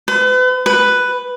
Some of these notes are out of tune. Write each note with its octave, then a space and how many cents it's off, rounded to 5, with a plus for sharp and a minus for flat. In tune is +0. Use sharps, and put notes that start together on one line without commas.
B4 +40
B4 +5